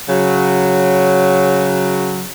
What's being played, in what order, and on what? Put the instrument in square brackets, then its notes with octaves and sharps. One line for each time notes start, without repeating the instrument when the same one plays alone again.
[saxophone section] C#3 F#3